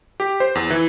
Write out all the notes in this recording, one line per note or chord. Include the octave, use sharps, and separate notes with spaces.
G4
C5
E2
E3